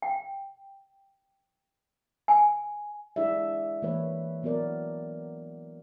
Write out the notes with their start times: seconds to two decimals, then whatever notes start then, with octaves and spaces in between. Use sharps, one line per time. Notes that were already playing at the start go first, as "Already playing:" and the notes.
0.02 G5
2.28 G#5
3.16 G#3 D4 E4 G#4 D5 E5
3.82 E3 A3 A#3 B4 C#5
4.43 F#3 B3 F#4 A#4 D5